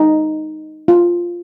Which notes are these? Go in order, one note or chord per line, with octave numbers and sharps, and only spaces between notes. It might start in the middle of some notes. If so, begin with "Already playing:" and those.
Already playing: D#4
F4